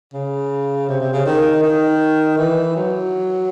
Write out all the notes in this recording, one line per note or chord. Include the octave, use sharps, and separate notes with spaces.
C#3
C3
C3
C#3
D#3
D#3
E3
F#3